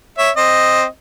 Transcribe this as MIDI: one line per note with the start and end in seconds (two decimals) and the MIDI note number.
0.18 0.30 73
0.18 0.30 76
0.37 0.85 60
0.37 0.85 75